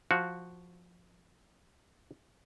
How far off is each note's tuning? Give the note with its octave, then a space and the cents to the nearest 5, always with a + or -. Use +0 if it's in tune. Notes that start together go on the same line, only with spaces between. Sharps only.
F3 +10 F#4 +0 F5 +15